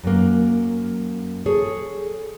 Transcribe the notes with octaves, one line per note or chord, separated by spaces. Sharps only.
F#2 A#3
G#4 A4 C#5